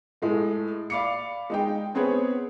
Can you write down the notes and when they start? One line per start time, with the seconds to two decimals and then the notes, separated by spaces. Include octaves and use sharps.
0.22 A2 G#3 A3
0.90 D5 F5 B5 D6 C7 C#7
1.50 G#3 D#4 G5
1.94 B3 C4 G#4 B4 C#5